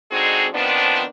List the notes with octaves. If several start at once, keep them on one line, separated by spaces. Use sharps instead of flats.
D3 G#3 C4 D#4 F#4 G#4
D#3 F3 B3 C4 D4